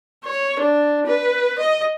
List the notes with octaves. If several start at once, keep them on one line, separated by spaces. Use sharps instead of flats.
C#5
D4
B4
D#5